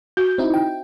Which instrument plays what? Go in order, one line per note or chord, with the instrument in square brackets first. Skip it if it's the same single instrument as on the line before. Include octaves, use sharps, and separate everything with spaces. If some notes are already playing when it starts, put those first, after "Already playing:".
[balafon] F#4 [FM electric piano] G6
[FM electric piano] C4 D#4 E4
G5